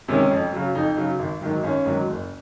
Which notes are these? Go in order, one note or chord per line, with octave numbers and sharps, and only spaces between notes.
C3 D#3 G#3 C#4
F2
C#3 F#3
F2 D#4
C#3 F#3
G#1
G#2 D#3 F#3
G#1 C#4
G#2 D#3 F#3
F#1